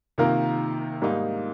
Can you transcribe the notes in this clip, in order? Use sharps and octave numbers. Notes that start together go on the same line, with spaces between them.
C3 D#3 A#3 F4 A#4
G#2 G3 A#3 D#4